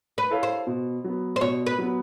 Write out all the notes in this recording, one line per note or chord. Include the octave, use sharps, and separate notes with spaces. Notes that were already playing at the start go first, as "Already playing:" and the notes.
B4
E4 A4 C#5 F5
C5
B2
F#3 B3
C5
B2 C#5
B4
F#3 B3